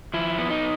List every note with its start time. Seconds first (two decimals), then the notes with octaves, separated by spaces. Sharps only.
0.14 F3 E4
0.38 B3
0.50 D#4